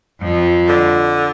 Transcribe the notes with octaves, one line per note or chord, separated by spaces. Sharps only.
F2 F3
D3